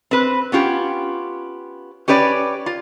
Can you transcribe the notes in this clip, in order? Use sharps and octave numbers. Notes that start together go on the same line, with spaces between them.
C4 B4
B3 C#4 F4 G4
C#4 G4 B4 C#5 D5
F4